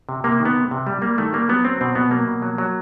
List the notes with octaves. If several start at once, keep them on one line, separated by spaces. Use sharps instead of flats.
C3
C3 A#3
D#3
B3
C3
C3
G3
G3 A#3
D#3 A3
G3 A#3
F#3 B3
F#3 C4
B2 C4
B2 B3
F#3 A#3
B2
F#3
F#3